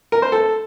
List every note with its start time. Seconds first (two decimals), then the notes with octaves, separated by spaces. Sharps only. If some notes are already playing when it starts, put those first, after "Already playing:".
0.12 A#4
0.22 C5
0.32 A4